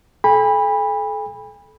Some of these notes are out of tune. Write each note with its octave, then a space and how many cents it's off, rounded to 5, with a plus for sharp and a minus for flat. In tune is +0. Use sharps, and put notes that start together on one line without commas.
A4 -35 G#5 -45 B5 -10